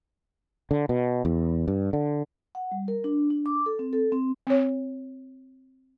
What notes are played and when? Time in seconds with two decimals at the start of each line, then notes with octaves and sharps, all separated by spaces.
0.71 D3
0.89 B2
1.25 E2
1.68 G2
1.93 D3
2.55 F#5
2.72 G3
2.88 A#4
3.04 D4
3.30 D4
3.46 D6
3.66 A4
3.79 C4
3.93 A4
4.12 C4
4.47 C4 C#5